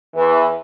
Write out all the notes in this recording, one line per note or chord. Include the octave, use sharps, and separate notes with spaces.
E2 E3